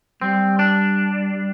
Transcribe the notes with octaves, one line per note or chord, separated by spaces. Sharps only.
G3 C4
D4